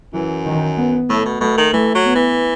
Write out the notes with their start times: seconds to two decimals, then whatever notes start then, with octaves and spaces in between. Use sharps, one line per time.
0.13 F#2 E3
0.46 D#3
0.77 B3
1.09 A2 A3
1.25 B2
1.41 B2 A3
1.57 D#3
1.73 E3 A3
1.95 F#3
2.05 B3
2.15 E3